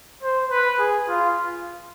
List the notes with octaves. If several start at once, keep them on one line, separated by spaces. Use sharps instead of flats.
C5
B4
G#4
F4